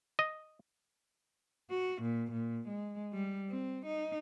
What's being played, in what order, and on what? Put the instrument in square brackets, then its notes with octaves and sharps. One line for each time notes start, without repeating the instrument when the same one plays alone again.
[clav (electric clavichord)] D#5
[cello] F#4
A#2
A#2
G#3
G3
C4
D#4